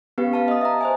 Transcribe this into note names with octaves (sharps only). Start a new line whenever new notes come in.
B3 C#4 G4 B4 F5
F5 A5
D#5 D#6
E5 A#5
C5 D#5 G#5